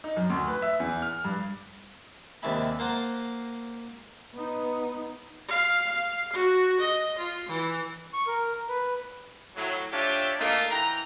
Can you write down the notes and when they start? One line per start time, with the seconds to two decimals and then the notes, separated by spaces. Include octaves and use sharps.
0.04 D#4
0.17 F#2
0.30 D2
0.48 B4
0.62 E5
0.80 E2
1.02 F6
1.24 G2
2.42 D#2 C3 D4 E5 G#5 B5
2.79 A#3 C5 F#5 A5 A#5 C6
4.35 B3 D#4
5.49 F5
5.88 F5
6.33 F#4
6.80 D#5
7.18 F4
7.49 E3
8.13 C#6
8.27 A#4
8.69 B4
9.57 A2 F#3
9.93 D4 F4 G4 C#5 E5
10.39 A3 A#3 D4 D#4 F4
10.71 E3 G5 A#5